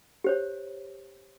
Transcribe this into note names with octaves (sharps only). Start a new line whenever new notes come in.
G4 C5 C#5